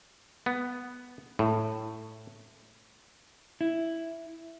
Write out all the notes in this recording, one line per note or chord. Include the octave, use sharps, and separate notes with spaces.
B3
A2
E4